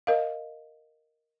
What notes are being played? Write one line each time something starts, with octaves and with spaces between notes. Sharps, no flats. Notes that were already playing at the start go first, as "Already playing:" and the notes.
A#4 D#5 F5